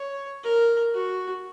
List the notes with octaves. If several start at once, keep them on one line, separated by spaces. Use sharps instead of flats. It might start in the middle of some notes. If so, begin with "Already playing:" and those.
Already playing: C#5
A#4
F#4